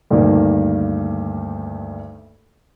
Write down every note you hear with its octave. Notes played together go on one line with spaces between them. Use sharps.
D2 G2 D#3 A#3